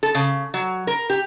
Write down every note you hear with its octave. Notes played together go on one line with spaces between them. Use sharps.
A4
C#3
F#3
A#4
G4